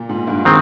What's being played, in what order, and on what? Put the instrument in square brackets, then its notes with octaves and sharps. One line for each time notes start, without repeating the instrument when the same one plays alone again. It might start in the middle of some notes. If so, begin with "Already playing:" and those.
Already playing: [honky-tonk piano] A#2
G#2
G2
[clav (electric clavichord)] D#3 G#3 C4